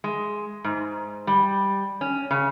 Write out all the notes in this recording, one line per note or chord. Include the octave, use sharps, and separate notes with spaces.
G#3
G#2
G3
C#4
C#3